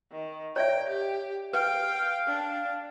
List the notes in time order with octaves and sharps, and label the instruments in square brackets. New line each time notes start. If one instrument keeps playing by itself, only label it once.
[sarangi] D#3
[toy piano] C#5 D5 E5 [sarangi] G5
[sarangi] G4
[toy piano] B4 [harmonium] F5 [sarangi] G5
[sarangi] D4